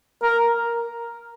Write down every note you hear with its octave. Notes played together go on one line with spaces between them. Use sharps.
A#4